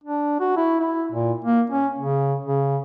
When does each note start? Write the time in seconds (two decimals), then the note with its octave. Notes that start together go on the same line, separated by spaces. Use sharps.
0.04 D4
0.40 F#4
0.57 E4
0.80 E4
1.12 A#2
1.45 A#3
1.70 C#4
1.99 C#3
2.46 C#3